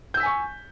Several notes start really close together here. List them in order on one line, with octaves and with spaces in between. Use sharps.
G6 E6 B6 G#5 C#6